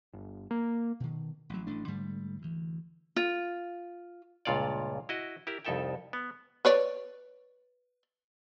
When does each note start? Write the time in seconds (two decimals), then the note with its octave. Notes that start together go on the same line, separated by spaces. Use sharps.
0.13 G1
0.51 A#3
1.00 B2 D#3
1.50 A1 F#3
1.67 A1 A3 D4
1.87 G#2 D3 G3 A3
2.42 D2 E3
3.16 F4
4.45 C#2 G2 A#2 F4 C#5 D5
5.09 E4 F#4 D#5
5.47 E4 G4 A#4
5.65 C2 F2 D#4 A4 E5 G5
6.13 B3
6.65 B4 C#5 D5